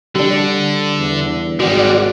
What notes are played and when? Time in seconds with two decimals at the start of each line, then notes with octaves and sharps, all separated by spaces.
0.15 D3 G3 D4
0.99 E2
1.60 G#1 G3 G#3 F#4 D5